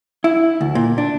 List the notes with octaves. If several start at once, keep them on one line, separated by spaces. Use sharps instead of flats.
E4
D2
A#2
D4